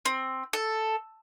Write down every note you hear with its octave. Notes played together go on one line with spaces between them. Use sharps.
C4
A4